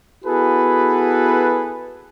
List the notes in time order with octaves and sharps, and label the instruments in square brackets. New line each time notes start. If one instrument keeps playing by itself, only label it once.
[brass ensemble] B3 E4 F#4 G#4 A4 B4